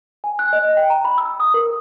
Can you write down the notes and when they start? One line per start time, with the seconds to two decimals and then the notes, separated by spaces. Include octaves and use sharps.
0.24 G#5
0.39 F#6
0.53 D#5
0.77 G5
0.90 A#5
1.05 B5
1.18 E6
1.40 D#6
1.54 A#4